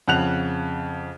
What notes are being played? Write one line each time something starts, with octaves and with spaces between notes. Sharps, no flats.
F2 C#3 F#5 F#6 F7